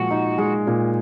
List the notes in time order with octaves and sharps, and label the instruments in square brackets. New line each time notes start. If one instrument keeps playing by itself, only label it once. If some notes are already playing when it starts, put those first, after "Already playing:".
Already playing: [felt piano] A#2 F3 G#3 [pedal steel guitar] F#4
[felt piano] D#4
G#3
A#2